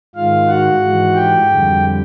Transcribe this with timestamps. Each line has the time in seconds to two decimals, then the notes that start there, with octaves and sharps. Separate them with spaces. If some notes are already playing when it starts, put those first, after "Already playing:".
0.15 G#2 D#3 G#3 F4 F5
0.48 F#4 F#5
0.82 G#2 E3 G#3
1.15 G4 G5
1.49 F2 D3 G3